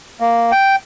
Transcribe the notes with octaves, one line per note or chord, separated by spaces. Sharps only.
A#3
G5